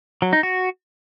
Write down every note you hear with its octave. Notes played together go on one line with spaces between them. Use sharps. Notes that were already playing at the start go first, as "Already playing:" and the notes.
F#3
D#4
F#4